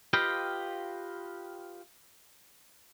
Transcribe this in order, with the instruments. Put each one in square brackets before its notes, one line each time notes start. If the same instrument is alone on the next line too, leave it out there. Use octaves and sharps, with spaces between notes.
[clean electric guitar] F4 G4 B4 D#5 F5 G5